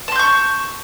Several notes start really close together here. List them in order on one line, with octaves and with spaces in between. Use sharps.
A5 C6 G6 C#6